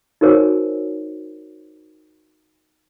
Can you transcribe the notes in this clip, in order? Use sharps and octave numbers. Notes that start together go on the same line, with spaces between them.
D#4 F#4 A#4 C5 C#5 G#5